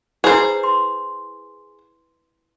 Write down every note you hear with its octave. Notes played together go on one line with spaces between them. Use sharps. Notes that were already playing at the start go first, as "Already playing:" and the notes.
E4 G#4 B4 C5
C6